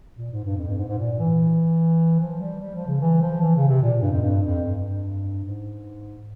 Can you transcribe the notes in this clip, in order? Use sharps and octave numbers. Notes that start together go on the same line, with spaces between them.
A#2
G#2
G2
F2
G2
G#2
G#2
A#2
E3
F3
G3
G3
F3
C#3
E3
F3
E3
C#3
C3
A#2
G2
F2
G2
F2
G2
G#2